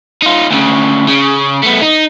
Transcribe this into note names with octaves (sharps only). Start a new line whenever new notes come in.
D#4 F4
D2 C#3
C#3
A3 B3
D#4